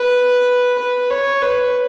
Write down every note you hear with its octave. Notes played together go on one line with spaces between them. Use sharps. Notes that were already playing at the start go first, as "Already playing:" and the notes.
Already playing: B4
B4
C#5
B4